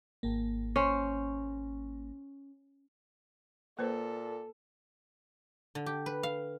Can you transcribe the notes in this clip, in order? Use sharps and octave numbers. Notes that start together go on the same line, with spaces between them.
G#1 A#3
C#4 C5
A#2 A#3 A4 B4 C5
D3
G4
B4
F5